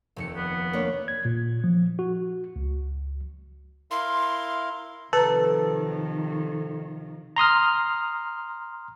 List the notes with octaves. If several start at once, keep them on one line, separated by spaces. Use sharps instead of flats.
F1 D#2 C#7
B3
A#3 D4 C#5
G#6
A#2
F3
F#4
C#2
E4 A#4 F5 C6
C3 D#3 F3 A4 B4 A#5
A#5 C6 D#6 F6